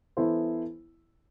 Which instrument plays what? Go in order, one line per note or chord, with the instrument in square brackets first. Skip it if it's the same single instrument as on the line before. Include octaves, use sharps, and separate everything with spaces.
[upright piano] E3 B3 E4 A4 C5